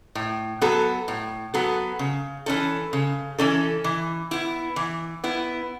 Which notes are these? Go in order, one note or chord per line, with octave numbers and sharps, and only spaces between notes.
A2
F#3 B3 F#4 A4
A2
F#3 B3 F#4 A4
C#3
E3 C#4 A4
C#3
E3 C#4 A4
E3
B3 E4
E3
B3 E4